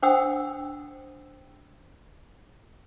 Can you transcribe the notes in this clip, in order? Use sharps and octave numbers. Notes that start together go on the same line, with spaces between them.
D4 C5 F#5 G5 D#6 E6